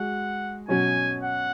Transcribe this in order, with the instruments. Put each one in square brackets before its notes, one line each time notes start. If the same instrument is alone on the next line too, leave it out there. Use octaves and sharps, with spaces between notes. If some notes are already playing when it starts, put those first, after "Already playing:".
Already playing: [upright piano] G#3 F#4 [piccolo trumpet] F#5
[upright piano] B2 F#3 C#4 F#4 [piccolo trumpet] G#5
[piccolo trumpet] F#5